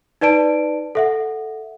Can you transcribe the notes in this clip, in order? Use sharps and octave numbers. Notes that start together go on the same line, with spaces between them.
D#4 B4 D5 A5 D7
A4 E5 F#5